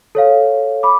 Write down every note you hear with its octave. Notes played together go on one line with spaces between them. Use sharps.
A4 C#5 F5
B5 D6